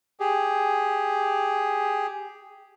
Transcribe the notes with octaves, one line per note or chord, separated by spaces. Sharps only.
G4 G#4